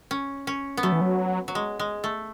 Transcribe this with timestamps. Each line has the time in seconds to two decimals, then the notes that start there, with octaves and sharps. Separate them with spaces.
0.11 C#4
0.47 C#4
0.77 B3
0.83 F#3 A3
0.92 E3
1.01 F#3
1.48 F#3
1.55 G#3
1.79 G#3
2.04 A3